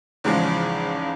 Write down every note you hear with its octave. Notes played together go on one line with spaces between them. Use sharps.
E2 G#2 C#3 F3 G#3